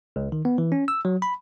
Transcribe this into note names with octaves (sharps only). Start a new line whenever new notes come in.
C#2
D#3
B3
E3
C#4
E6
F#3
B5